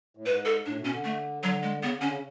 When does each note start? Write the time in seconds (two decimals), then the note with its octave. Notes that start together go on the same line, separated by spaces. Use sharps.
0.17 A2
0.25 G#2 B4
0.45 A4
0.66 A2 D4
0.79 B2
0.85 C#4
0.92 D3
1.05 A3
1.43 D3 F#3
1.63 G#3
1.82 C#3 B3
1.96 D3
2.01 C#4
2.08 C#3